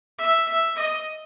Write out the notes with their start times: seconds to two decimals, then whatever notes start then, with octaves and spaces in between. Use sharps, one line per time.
0.18 E5
0.47 E5
0.76 D#5